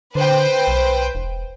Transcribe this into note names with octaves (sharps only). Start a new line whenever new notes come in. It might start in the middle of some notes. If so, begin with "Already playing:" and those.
D3 B4 C5 G5
B1
E1